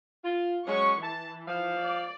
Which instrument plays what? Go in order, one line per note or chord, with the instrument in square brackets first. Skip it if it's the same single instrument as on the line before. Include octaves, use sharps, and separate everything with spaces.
[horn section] F4
[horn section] F#3 G#3 C#4 [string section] C#6
[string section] E3 [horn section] A5
[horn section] F3 F5
[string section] D5